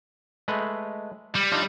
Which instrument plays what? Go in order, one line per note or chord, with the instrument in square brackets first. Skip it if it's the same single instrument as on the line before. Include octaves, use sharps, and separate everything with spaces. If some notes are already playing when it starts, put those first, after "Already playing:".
[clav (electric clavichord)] G#3 A3 B4
[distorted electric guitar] G3
[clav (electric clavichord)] D4 D#4 F4